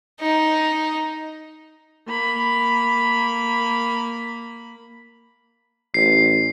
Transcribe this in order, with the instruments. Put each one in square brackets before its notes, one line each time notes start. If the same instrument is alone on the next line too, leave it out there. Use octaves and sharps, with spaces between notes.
[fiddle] D#4
[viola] A#3 B5
[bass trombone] A1 [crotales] C7